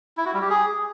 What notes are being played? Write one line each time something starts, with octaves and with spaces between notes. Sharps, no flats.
E4
F#4
G3
G4
G#4